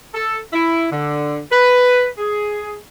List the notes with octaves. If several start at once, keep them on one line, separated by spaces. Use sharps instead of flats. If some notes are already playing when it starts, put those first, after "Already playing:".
A4
E4
D3
B4
G#4